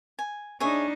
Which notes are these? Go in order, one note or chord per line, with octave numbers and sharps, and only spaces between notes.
G#5
D4 D#4 G#4 C#5 E5